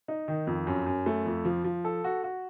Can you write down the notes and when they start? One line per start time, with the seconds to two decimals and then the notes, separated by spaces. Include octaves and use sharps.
0.08 D#4
0.28 D#3
0.47 F2
0.67 F#2
0.86 F#2
1.06 A3
1.26 F2
1.45 F3
1.64 F3
1.85 A4
2.04 F#4
2.24 F#4